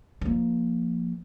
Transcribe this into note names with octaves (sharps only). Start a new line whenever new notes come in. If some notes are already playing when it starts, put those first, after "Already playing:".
F3 A#3